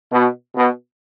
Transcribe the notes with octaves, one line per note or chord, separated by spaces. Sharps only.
B2
B2